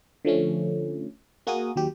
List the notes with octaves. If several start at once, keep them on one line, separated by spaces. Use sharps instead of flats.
D3 F3 A3 C#4
A#3 F#4 G#4 A#4 D#6
D#2 F#3 G4